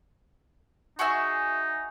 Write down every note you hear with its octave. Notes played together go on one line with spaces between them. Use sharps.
D#4 F#4 G#4 E5